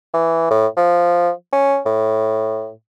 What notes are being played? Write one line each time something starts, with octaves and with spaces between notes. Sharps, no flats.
E3
A2
F3
C#4
A2